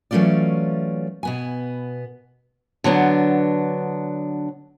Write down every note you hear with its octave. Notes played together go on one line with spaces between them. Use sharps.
E3 F#3 A3 C#4 F4 D5
B2 B3 G#5
D3 F#3 B3 D4